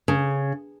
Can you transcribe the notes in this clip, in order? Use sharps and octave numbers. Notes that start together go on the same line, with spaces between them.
C#3